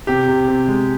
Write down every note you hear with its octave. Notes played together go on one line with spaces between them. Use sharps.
C3 G4
C3
C3
G#3